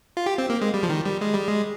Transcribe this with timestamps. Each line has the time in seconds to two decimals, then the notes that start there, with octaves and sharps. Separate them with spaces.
0.17 F4
0.26 G4
0.38 C4
0.50 A#3
0.62 G#3
0.74 G3
0.83 F3
0.89 D#3
1.06 G3
1.21 G#3
1.34 G3
1.47 G#3